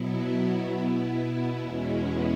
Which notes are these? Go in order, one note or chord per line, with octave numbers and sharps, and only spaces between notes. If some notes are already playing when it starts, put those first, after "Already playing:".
Already playing: B2 F#3 B3 E4
B2 B3 E4
E2 B2 G#3 C#4 E4